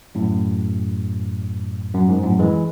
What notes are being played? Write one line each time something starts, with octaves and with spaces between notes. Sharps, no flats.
F#2 A2
F#2
G#2
F#2 A2
E3 G#3